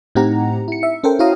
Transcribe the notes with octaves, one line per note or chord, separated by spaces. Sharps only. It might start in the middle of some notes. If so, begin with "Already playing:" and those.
A2 C4 D#4 G4 F#5 A#5
E4 C#7
E5
C#4 A4 A#4 C5 G5
E4 F#4 C#5 F5 A#5 D#6